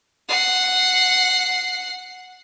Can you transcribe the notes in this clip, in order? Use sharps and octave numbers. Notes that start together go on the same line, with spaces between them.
F#5 C7